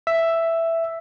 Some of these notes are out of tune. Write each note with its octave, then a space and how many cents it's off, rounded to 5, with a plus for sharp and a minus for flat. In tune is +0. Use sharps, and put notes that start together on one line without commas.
E5 +5